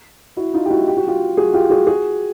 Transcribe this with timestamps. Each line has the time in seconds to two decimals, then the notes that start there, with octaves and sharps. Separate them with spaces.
0.37 E4 F#4
0.54 D#4 F4
0.66 G4
0.71 E4 F#4
0.88 G4
0.97 F#4
1.07 F4 G4
1.37 F#4 G#4
1.53 F4 G4
1.70 F#4 G#4
1.87 F#4 G#4